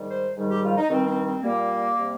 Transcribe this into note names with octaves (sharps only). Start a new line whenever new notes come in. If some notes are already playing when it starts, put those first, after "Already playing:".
Already playing: G#2 D#3 G3
C5
G#2 D#3 G3
G4
F4
D#4
G2 D#3 G3 C4
C4
C4
A#2 G3 A#3
C3 G3